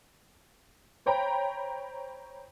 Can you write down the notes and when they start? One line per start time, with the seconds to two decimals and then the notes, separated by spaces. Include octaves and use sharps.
1.06 C5 C#5 G5 A#5 B5